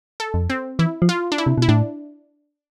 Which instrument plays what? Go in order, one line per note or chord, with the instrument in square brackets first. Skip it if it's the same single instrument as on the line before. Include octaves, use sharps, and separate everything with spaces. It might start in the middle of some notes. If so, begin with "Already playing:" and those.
[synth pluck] A4
[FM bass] F2
[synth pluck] C4
[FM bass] E3 [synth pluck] E4
[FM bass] F3
[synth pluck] F4
D4
E4
[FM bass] C3
[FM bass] B2 [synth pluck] E4
[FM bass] A2 [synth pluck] D4